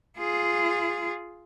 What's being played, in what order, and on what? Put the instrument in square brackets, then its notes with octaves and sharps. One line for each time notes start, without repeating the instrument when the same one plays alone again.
[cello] F4 G#4